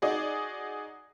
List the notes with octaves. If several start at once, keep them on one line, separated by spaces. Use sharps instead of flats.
D#4 F#4 G#4 D5 D#5